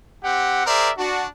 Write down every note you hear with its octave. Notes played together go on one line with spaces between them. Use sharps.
C4 G4 F#5
G#4 A#4 C5 D5 E5
D4 F#4